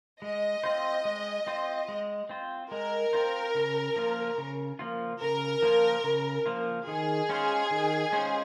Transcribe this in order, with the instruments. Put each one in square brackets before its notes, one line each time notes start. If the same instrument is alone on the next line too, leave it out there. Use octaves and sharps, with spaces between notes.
[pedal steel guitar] G#3 [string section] D#5
[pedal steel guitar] C4 F4 C5
G#3
C4 F4 C5
G#3
C4 F4 C5
[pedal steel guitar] G#3 [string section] A#4
[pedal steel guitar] C4 F4 C5
C#3
F3 A#3 F4
C#3
F3 A#3 F4
[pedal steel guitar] C#3 [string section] A#4
[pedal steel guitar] F3 A#3 F4
C#3
F3 A#3 F4
[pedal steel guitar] D#3 [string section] G#4
[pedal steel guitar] G#3 C#4 F4 C5
D#3
G#3 C#4 F4 C5